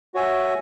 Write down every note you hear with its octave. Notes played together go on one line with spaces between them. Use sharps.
F#4 C#5 E5 G#5